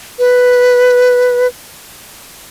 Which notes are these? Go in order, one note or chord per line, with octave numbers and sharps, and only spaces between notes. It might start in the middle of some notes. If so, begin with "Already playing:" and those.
B4